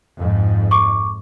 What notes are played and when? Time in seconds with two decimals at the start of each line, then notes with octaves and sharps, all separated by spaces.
0.18 F2 G#2
0.71 C#6 D6